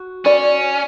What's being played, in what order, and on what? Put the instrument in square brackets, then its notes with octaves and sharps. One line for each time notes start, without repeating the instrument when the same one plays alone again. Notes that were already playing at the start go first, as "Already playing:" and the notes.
Already playing: [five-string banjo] F#4
[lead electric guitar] C#4 [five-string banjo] D5